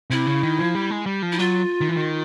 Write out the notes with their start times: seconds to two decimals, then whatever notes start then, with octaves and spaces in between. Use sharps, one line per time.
0.10 C3 E4
0.27 C#3
0.43 D#3
0.59 F3
0.75 G3
0.90 G#3
1.06 G3
1.23 F3
1.32 E4
1.38 F#3 F4
1.81 D#3
1.89 E3
1.97 D#3